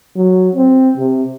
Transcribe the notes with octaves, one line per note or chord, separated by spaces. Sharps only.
F#3
C4
C3